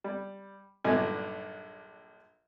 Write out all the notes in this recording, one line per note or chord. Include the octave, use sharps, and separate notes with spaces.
G3
A#1 G2 D3 F#3 D#4 G#5